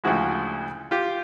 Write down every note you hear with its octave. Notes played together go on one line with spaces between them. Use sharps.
D2 C#3 F3 G#3 E4 F#4
F4 G4